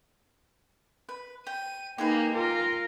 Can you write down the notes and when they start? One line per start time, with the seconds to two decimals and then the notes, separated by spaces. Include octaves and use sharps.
1.09 B4
1.47 G5 D#7
1.98 A#3 D#4 G4 G#4 B4
2.34 F4 A#4